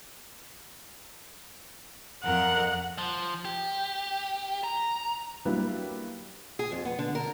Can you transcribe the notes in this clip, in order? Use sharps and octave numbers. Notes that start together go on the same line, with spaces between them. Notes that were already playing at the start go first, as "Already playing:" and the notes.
F2 A#4 F#5
F3
G4
A#5
F#3 G3 A#3 D4 E4 B4
G#4
F2
B3
D3
A#4